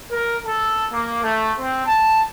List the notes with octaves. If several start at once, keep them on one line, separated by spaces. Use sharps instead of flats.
A#4
A4
A#3
A3
C4
A5